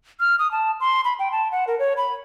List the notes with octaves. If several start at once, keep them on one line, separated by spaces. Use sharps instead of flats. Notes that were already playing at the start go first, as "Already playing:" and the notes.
F6
D#6
A5
C6
B5
G5
A5
F#5
A#4
C#5
B5